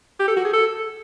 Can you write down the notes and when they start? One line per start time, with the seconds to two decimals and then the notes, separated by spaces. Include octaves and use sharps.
0.20 G4
0.28 A4
0.36 F#4
0.45 G#4
0.53 A4